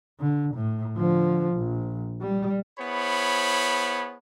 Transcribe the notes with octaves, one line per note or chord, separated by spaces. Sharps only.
D3
A2
D3 F3
A#1
G3
B3 E4 G#4 C5 C#5 B5